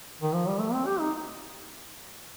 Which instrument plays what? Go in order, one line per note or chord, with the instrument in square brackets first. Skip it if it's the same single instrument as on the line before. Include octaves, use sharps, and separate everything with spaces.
[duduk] D#3
F3
G3
A3
C4
G4
D#4